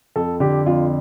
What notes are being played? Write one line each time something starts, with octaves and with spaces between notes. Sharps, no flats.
F2 A4
D3 G4
F2 F4